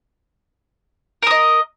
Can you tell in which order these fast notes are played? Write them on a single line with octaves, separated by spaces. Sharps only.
A#4 D#6 D#5